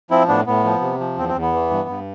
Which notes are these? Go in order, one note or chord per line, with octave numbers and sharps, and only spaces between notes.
F3 C4 E4
A2 B3 D4
A2 B3
F3
C3
F3
E2 C4
C4
E2
B3
E3
G2
G2